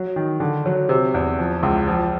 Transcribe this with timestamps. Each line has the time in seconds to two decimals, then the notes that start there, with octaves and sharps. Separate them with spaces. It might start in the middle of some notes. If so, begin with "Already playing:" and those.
Already playing: F#3
0.16 D#3
0.40 D3
0.66 F#3
0.89 C3
1.14 E2
1.38 F3
1.63 C#2
1.87 F3